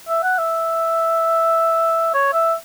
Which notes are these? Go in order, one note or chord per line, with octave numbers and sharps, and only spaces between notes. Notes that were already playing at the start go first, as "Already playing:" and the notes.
E5
F#5
E5
C#5
E5